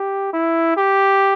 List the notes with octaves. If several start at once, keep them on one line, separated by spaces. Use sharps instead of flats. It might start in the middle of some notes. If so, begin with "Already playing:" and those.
Already playing: G4
E4
G4